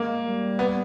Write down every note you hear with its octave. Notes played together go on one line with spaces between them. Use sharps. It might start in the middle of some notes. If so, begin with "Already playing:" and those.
Already playing: G#3 A#3
G3
B3